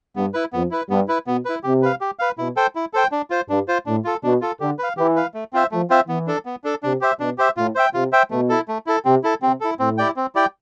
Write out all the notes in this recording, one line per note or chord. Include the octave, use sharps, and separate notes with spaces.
G2 B3
E4 B4
F2 B3
E4 B4
G2 B3
E4 B4
B2 B3
E4 B4
C3 G4
B4 F5
G4
B4 F5
B2 E4
A4 C5 G5
E4
A4 C5 G5
D4
F4 C5
G2 D4
F4 C5
A2 D4
F4 A4
B2 D4
F4 A4
D3 G4
B4 F5
E3 G4
B4 F5
A3
C4 F4 C5 E5
F3 A3
C4 F4 C5 E5
E3 B3
D4 A4
B3
D4 A4
C3 D4
G4 C5 E5
B2 D4
G4 C5 E5
A2 F4
C5 E5 G5
C3 F4
C5 E5 G5
B2 A3
E4 A4
A3
E4 A4
C3 C4
E4 A4
C3 C4
E4 A4
A2 C4
E4 G4 D5 G5
C4
E4 G4 D5 G5